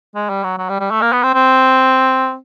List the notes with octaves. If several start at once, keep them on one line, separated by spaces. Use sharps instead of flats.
G#3
G3
F#3
F#3
G3
G3
A3
A#3
B3
C4
C4